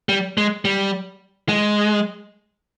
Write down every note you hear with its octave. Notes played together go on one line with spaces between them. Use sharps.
G3
G#3
G3
G#3